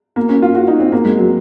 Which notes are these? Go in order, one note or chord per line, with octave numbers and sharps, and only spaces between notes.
A#3
C#4
F4
F#4
D#4
C4
A#3
G#3
F#3